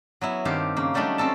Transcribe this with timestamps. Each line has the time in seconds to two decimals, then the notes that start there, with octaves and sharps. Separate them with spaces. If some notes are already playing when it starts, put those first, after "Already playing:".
0.21 F#3 B3 E4
0.45 G2 D#3 C4 G4 F5
0.77 C#3 A#3
0.94 F#3 G3 A3 D4 D#4
1.18 C4 C#4 A4 A5